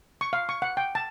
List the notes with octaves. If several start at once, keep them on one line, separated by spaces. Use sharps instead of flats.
C#6
F5
C#6
F#5
G5
A5